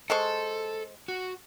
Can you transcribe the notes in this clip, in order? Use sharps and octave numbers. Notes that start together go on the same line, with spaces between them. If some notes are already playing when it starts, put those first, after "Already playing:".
G#3 A4 C5 C#6
F#4